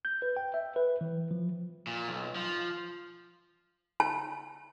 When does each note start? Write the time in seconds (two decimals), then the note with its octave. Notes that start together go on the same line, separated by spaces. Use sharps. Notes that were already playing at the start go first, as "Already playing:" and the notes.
0.05 G6
0.22 B4
0.37 G5
0.54 E5
0.76 B4
1.01 E3
1.31 F3
1.87 A#2
2.08 B1
2.35 F3
4.00 A5